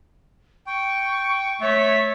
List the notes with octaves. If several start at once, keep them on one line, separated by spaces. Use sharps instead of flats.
G5 C#6
A3 C#5 E5 B6